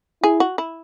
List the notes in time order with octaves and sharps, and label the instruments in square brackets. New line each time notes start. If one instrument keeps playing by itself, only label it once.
[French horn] E4 [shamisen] G#4
[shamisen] F#4
E4